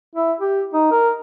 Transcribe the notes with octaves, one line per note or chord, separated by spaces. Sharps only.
E4
G4
D#4
A#4